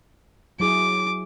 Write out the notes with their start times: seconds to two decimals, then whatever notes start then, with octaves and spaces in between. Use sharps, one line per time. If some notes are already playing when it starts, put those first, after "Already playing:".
0.60 F#3 E4 G#4 D6